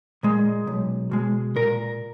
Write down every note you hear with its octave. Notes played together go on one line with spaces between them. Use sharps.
A#2 G#3
B1
B2 G#3
A#2 A#4